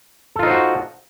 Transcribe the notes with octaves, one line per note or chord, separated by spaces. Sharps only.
D#4 F4 F#4 A4 C5